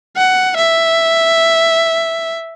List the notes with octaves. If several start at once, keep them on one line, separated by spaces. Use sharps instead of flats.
F#5
E5